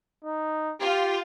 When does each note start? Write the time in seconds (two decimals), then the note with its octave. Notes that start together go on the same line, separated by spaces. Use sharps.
0.24 D#4
0.81 F4 G4